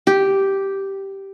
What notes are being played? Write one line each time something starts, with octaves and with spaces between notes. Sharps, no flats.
G4